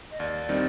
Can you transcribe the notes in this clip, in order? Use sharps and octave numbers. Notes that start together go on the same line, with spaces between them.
D#5
D#2 D5
D#3 G3 C4 D#4